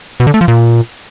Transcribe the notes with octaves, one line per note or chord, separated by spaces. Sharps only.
B2
D3
A3
F3
A#2